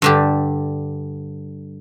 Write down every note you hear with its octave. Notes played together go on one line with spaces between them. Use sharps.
G2 D3 G4